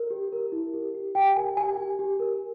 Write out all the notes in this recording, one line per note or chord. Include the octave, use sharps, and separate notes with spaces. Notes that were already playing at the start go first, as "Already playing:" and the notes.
Already playing: A#4
G4
A#4
E4
G4
G4
G4 G5
A#4 G#5
G4 G#5
G4
G4
A#4